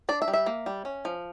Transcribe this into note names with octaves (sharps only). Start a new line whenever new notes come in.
D4 D5
E5
G3
E5
A#3
G3
C#4
F3